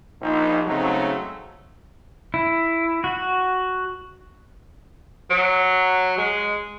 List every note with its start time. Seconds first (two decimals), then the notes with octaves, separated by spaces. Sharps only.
0.22 A#1 D#4
0.66 C#3 F#3 G#3 A3 C4 D#4
2.34 E4
3.04 F#4
5.30 F#3
6.18 G#3